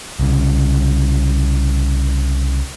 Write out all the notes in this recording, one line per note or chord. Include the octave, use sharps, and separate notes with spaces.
C2 C#3